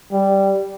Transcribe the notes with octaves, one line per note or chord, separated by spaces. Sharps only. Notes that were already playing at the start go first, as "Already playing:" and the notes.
G3